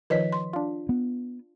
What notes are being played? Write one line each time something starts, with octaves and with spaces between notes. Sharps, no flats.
D#3 F3 B4 C#5 D#5 B6
C6
D4 F4
B3